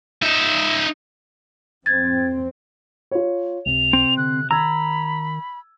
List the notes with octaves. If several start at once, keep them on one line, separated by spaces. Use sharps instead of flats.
D#4 E5
F2 C4 G#6 A6
F4 C#5
C#2 C3 F7
C4
D3 F#6
D#3 A#5 B5 E6 G#6